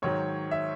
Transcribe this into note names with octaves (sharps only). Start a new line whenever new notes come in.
G#2 D#3 F#3 C#5
E5